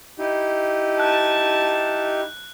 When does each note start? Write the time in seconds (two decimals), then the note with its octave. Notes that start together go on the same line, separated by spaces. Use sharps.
0.19 D#4 E4 G4
1.00 A5 F#6